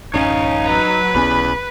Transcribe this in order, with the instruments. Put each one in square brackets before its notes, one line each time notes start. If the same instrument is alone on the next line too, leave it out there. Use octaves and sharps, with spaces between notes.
[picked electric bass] A1 F#2 C#4 [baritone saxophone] D#4 [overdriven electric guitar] C#5 F5
[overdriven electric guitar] F#3 A#5 [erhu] B4
[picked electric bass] B1 B3 C#4 [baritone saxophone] E2 [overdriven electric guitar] B5